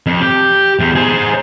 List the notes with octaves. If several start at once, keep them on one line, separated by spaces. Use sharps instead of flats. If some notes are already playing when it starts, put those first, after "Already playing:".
F2
G4
E2
G#4 C5